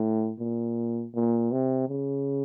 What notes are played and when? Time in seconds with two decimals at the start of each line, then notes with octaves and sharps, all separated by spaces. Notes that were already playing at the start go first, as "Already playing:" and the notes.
Already playing: A2
0.40 A#2
1.14 A#2
1.52 C3
1.89 C#3